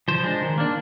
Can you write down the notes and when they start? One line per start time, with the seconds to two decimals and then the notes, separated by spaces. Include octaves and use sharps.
0.08 F3 C5
0.24 G#3 D4
0.42 D#3
0.58 A#3 D4